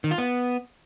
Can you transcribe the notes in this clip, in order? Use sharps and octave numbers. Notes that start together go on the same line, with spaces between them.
D#3
F4
B3